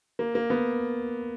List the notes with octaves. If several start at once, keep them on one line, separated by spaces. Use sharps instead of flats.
A#3
A#3
B3